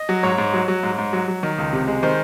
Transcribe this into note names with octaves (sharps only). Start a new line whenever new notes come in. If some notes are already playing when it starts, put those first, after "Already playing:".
Already playing: D#5
F#3
G#2 C#5
G#2
F#3
F#3
G#2
G#2
F#3
F#3
D#3
C#2
C3
G#3
D#3 C5